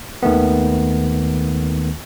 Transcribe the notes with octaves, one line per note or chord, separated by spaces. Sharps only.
D#2 D#3 A3 B3